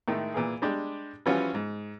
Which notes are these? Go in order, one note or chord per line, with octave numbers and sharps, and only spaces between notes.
A2 D#3 G#3 A3
A#2 E3 G#4
G3 G#3 D4 G4
E3 F3 G3 C#4 F4 F#4
G#2